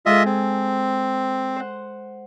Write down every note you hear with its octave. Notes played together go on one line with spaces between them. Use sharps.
G#3 F4 G#4 A4 D#5 E5
C4
C5 F#5